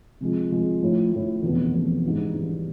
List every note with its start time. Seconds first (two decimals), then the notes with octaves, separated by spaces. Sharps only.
0.20 C3 F3 G#3
0.51 C3 F3 G#3
0.82 A2 F3 A3
1.12 A2 F3 A3
1.43 F1 E2 B2
1.73 F1 E2 B2
2.03 G#2 E3 G3
2.34 G#2 E3 G3